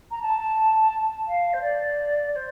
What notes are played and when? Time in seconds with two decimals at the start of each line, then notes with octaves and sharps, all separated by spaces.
0.11 A#5
0.22 A5
1.27 F5
1.53 C5
1.62 D5
2.32 D5
2.36 C5